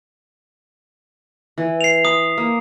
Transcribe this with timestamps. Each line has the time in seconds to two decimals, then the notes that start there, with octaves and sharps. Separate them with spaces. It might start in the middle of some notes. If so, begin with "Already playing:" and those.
1.58 E3
1.81 C7 F7
2.05 B5 D#6
2.38 A#3